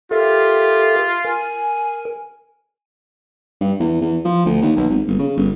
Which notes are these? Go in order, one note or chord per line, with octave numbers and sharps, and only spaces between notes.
F4 G4 A4 A#4 E5
A#4 G#5
G2
E2
E2
F3
D2
D#2
B1
G#1
G1
C#3
G1